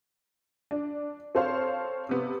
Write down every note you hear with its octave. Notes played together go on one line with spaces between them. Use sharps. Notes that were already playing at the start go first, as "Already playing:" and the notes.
D4
C4 A4 C5 C#5 F5
C3 B3